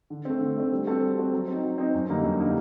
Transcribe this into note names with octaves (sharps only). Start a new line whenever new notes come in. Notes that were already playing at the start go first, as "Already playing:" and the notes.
D3
A3 C4
D3
A3 C4
G3
C4 F#4 A4
G3
C4 F#4 A4
F#3
C4 D#4
F#3
C4 D#4
F#2
D3 G3 A#3 D#4
F#2
D3 G3 A#3 D#4